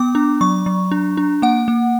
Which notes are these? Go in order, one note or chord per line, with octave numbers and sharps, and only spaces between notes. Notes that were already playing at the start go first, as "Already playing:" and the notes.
Already playing: B3 D6
D4
F#3 C#6
F#3
D4
D4
A#3 F#5
A#3